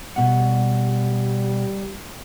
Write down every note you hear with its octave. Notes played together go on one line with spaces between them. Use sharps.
B2 G3 F#5